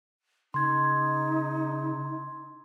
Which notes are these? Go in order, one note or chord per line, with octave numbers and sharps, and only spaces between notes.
C#3 D#4 C6 G#6